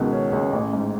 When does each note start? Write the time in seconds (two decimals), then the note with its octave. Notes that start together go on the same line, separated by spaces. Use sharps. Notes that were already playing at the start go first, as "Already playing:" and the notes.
Already playing: C#2 B2 D#3
0.12 C#4
0.33 C#2
0.53 A1
0.73 G#2